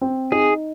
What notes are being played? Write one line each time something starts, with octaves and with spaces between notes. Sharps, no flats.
C4
D#4 G#4